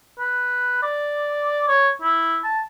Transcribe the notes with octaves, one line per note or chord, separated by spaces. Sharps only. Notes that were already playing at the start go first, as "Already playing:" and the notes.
B4
D5
C#5
E4
A5